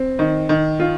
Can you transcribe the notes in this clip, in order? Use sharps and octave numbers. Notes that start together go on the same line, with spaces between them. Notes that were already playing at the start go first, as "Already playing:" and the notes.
Already playing: C4
D#3
D#3
F4